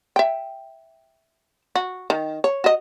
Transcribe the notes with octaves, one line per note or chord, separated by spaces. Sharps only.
E5 G5
F#4
D#3
C#5
F#4 D#5